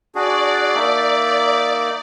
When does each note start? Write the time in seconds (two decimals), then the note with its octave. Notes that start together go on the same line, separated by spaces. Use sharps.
0.15 D4 F#4 G#4 D5
0.75 A#3 D#4 E5